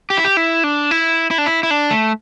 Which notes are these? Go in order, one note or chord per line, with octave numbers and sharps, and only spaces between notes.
G4
E4
G4
E4
D4
E4
E4
D4
E4
E4
D4
A3